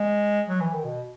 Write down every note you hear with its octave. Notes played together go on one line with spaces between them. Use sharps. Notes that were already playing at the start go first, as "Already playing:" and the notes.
Already playing: G#3
F#3
E3
D#3
B2